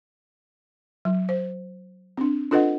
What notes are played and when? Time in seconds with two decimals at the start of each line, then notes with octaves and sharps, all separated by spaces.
1.05 F#3
1.29 C5
2.17 C4 D4
2.51 D4 F4 A4 B4 D#5 F#5